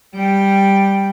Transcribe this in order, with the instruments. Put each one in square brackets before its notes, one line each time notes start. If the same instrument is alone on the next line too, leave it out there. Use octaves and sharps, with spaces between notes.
[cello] G3 G5